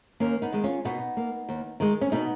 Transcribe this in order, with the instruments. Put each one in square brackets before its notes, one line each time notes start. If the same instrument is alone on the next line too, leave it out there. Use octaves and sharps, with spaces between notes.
[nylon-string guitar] D#2 A#3 C#4
B3 D#4
D#3 G#3
C#4 F4
B2 B3 D#4
A#3
D#2
D#3 G#3
C#4
B2 B3 D#4